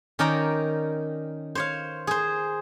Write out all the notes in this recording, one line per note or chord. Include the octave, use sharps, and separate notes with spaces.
D#3 C#4 A#4 D5 G5 A#5
C5 C#5 F5
G#4 C5